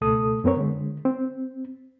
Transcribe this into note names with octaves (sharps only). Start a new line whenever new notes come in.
C#2 B2 A3 A4 D#6
F#2 B3 C4 A#4 C#5
D3 G#3
C4